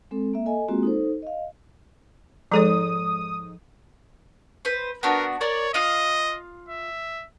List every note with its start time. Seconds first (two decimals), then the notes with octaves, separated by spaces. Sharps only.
0.11 G#3 C4 A4
0.34 A#3 E5
0.46 A4 D#5 G#5
0.68 G#3 A#3 C4 F4 F#4 G#4
0.83 D#4 A4 C5
1.22 D#5 F5
2.52 G#2 F3 D#4 A4 C#5 D#6
4.65 B4 C5
5.03 B3 D4 F#4 A#4
5.41 A#4 C#5 D5
5.74 F4 D#5 F5 D#6
6.69 E5